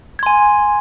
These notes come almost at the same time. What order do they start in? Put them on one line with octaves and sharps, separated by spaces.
G#6 C6 G#5